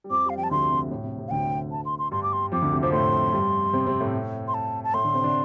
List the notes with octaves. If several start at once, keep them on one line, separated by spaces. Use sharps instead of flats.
G3
F2 F3 D6
G3 F5
F3 G5
A5
D2 D3 C6
C3
A2
C3
C3
F5
D2 D3 G5
A5
C6
C6
G2 G3 C6
D6
C6
F2 F3 D6
D2 D3
C3
F2 F3 D6
A2 A3 C6
G2 G3
C3 C4
C3 C4
A2 A3
C6
A5
A5
A2 A3 C6
D3 D4
C3 C4
D3 D4